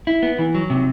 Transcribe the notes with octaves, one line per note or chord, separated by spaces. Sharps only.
E4
B3
E3
F#3
C3